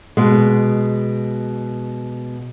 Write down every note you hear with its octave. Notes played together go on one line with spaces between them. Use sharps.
B2 G#3